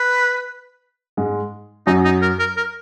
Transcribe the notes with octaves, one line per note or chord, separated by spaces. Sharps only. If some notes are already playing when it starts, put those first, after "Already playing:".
Already playing: B4
G#2 G#3
F#2 F#3 D#4
D#4
A#4
A#4
A#4